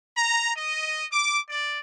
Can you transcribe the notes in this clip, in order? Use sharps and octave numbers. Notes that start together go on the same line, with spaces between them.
A#5
D#5
D6
D5